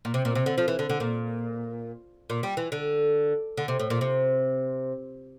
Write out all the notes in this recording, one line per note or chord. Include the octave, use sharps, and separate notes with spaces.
A#2
C3
A#2
C3
D3
F3
E3
D3
D3
A#2
A#2
G3
E3
D3
D3
C3
A2
A#2
C3